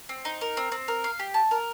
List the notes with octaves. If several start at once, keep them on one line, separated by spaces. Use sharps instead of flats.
C4
D#4
A#4
C4
C4
A#4
F5
G4
A5
A#4